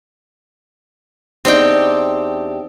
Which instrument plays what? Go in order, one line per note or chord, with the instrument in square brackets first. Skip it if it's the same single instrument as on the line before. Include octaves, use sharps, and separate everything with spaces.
[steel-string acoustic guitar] E2 D4 G4 [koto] C4 D#4 G5